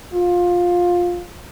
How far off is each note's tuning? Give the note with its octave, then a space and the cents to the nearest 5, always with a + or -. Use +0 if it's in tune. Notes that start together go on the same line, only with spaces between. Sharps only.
F4 +15